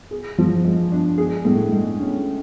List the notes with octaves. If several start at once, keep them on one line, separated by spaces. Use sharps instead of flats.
G#4
F3
G#3
D4
G#4
A2
G#3
C#4